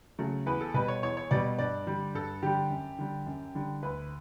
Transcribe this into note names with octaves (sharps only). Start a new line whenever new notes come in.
C#3 F#3 A3
E2 B4
A4
B2 G3 B4
C#5
E2 C#5
C#5
B2 G3 D5
G2 D5
D3 G3
G2 A4
D3 G3 G4
F#2
D3 G3
F#2
D3 G3
D2 B4